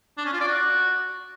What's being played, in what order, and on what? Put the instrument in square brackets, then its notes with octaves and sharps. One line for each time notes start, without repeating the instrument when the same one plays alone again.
[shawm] D4
C#4
F4
D5
F#4